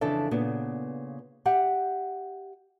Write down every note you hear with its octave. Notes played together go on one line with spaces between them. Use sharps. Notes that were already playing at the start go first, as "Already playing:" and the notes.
F2 C#3 E3 D4 A4 E5
A#2 C#3 B3
G4 E5 F#5